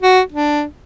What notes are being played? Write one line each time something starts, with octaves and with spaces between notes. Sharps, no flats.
F#4
D4